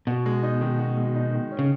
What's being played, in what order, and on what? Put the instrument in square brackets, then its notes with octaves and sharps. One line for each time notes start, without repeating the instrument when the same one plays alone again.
[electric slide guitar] B2 [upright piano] F#4
[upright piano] G#3
D#4
D#3
F#4
G#3
D#4
D#3
C#4
[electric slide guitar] C#3